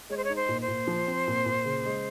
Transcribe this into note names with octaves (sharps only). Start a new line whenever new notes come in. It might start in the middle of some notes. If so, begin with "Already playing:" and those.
G#3 C#5
C5
C#5
D#4
C5
A#2
C5
A#2
F3
C4
A#2
A#2
C#3
G#3